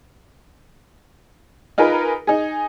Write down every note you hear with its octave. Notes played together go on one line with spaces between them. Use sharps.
D#4 F4 G#4 A#4 B4
D#4 G#4